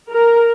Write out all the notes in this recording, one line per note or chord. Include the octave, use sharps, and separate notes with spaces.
A#4